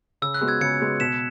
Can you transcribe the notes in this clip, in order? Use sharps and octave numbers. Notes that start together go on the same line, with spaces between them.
C#3 E6
F#6
G#3 B3 F#4
E6 G#6
C#3 G#6 C#7
G#3 B3 F#4
B2 B6 E7